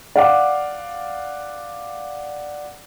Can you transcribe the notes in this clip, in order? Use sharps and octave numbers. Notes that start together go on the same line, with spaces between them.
D5 F5 F#5 D6